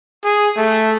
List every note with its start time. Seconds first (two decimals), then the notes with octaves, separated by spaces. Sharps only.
0.24 G#4
0.57 A3